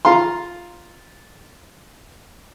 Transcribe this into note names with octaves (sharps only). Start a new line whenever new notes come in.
F4 F5 A#5 C6